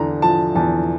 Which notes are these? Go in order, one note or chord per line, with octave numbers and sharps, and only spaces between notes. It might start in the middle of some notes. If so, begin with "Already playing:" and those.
Already playing: E2 D3 A#5
F3 A5
E2 A5